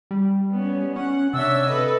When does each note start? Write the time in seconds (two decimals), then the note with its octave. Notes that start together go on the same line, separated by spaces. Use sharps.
0.11 G3
0.51 B3 C#4
0.96 C#4 F#5
1.34 C3 D4 C#5 E5 E6
1.67 A4 B4 D#5